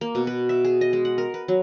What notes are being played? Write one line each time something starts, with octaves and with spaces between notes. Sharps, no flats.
A#3
B2
B4
E5
G#4
D#5
G#3
F#5
A#4
B4
F#3